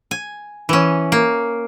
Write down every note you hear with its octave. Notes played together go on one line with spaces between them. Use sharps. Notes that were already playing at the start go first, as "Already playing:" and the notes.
G#5
E3 C#4
A#3